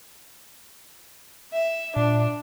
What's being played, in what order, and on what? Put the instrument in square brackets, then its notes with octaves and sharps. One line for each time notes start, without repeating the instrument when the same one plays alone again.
[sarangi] E5
[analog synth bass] A#2 [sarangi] D4